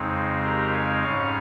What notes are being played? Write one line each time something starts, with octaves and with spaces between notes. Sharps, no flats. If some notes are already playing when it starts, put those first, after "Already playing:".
Already playing: F2 C#3 G#3 C4 D#4
G4 A#4
F5 G#5
G#2 G3 C#4 C#5 F5